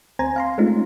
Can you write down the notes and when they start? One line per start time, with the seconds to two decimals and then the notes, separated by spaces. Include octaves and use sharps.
0.19 D2 C4 C5 G#5 A#5
0.36 F5 A#5 C6
0.58 G#3 A3 C4 C#4 D#4 F4